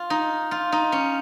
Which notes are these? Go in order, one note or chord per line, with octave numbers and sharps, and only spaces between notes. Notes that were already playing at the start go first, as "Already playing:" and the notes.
Already playing: F4
D#4
F4
D#4
C#4